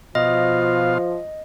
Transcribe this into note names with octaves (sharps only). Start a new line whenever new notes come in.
B2 F3 F4 D#5 F5